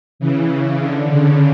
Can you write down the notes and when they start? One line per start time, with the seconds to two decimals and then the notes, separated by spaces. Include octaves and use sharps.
0.19 C#3 E3
0.79 D3
1.08 C#3